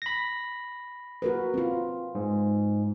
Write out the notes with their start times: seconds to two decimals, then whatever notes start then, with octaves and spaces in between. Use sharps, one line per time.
0.02 B5 A#6
1.22 F#4 A#4 B4
1.54 C4 F4
2.15 G#2